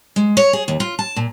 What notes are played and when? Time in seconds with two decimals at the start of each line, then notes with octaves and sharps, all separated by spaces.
0.16 G#3
0.37 C#5
0.53 G#4
0.68 D#2
0.80 F4
0.99 A5
1.16 A#2